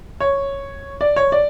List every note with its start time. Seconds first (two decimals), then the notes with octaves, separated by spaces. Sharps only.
0.20 C#5
1.01 D5
1.16 C#5
1.32 D5